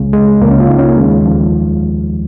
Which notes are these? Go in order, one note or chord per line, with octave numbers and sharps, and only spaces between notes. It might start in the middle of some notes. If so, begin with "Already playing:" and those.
Already playing: C#2 C#3 G#3
G#3
C#2 C#3 A#3
C#4
F4
D#4
C#4
A#3
D#2 D#3 G#3
F3